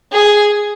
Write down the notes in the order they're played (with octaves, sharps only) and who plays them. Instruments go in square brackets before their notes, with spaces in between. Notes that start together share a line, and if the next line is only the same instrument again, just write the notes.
[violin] G#4